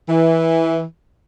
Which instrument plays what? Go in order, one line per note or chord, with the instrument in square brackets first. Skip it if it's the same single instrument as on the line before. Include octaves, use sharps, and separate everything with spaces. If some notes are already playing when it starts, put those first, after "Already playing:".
[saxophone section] E3